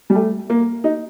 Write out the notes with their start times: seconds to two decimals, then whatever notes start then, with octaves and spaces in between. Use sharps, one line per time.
0.10 G3
0.15 A3
0.50 A#3
0.84 D#4